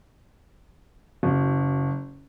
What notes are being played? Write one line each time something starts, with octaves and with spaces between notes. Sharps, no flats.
F#1